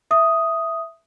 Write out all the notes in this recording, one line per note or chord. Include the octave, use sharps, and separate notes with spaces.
E5 D#6